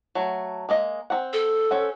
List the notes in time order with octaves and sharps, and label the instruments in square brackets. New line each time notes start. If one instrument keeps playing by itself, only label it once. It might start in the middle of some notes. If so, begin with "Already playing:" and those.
[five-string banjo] F#3 A3
G#3 A#3 D#5
C4 F#5
[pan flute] A4
[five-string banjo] C#4 C5 F#5